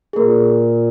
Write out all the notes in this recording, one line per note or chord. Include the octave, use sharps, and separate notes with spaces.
G#4
A#2 A#3 A#4